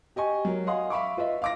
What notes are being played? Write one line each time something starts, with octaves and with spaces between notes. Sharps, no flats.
G4 D#5 G#5 C#6
F#3 A#4
D#5 F5 F#5 G#5 C6 D#6
E5 F5 B5 C#6 D6
F4 B4 D#5 E5
F5 D6 A#6